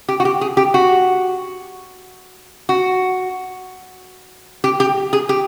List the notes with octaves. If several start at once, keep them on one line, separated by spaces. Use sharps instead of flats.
G4
F#4
G4
G#4
G4
F#4
F#4
G4
G4
G#4
G4